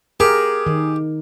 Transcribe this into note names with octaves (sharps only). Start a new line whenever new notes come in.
G4 G#4 A#4
D#3